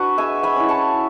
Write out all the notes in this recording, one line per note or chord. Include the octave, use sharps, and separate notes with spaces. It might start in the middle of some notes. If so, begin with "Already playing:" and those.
Already playing: D4 F#4 B4
G#3 E5 G#5
G#5 B5
C#4 E4
A5 C#6